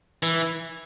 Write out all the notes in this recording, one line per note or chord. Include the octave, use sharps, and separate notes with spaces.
E3